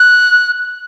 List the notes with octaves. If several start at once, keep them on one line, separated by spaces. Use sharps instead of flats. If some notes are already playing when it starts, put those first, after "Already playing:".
Already playing: F#6